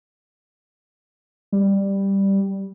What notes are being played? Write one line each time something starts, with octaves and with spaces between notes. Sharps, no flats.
G3